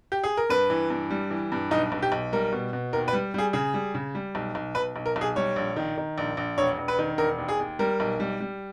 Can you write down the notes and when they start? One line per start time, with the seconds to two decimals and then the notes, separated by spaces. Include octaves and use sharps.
0.12 G4
0.24 G#4
0.37 A#4
0.50 G2 B4
0.70 E3
0.90 G2
1.11 G3
1.31 E3
1.52 G2
1.71 B1 D#4
1.92 B1
2.02 G4
2.12 B1
2.33 G3 A#4
2.52 B2
2.73 B2
2.93 D#2 A#4
3.08 B4
3.13 G3
3.34 G3 G#4
3.53 C#3 G#4
3.74 G3
3.94 C#3
4.15 G3
4.35 B1
4.55 B1
4.75 B1 B4
4.96 B1
5.06 A#4
5.16 B1
5.21 G#4
5.36 G3 C#5
5.56 A#1
5.76 D#3
5.98 D#3
6.18 A#1
6.37 A#1
6.58 E1 C#5
6.78 E1
6.88 B4
6.99 D#3
7.18 E1 A#4
7.38 D#2
7.48 G#4
7.59 D#2
7.79 G3 A#4
8.00 B1
8.20 G3
8.40 G3